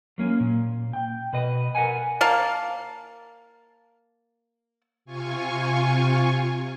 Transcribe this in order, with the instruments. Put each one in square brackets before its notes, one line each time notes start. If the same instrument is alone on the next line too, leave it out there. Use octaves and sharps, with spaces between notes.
[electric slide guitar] F#3 A#3 C#4
A#2
G5
B2 B4 D#5
A#4 B4 F#5 G#5
[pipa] A#3 F5 A5
[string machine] C3 F4 G#5 C#6